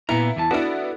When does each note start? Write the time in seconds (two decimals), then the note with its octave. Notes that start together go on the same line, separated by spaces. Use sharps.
0.09 A#2 B3 E4 A#5
0.36 E2 E3 A5
0.51 B3 D4 E4 F#4 A4 D5